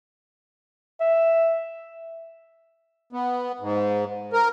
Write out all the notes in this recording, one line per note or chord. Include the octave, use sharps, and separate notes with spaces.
E5
B3
G#2
A#4